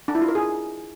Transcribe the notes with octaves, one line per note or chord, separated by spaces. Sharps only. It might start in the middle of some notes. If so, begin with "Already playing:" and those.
D4
E4
F4
A#4
G#4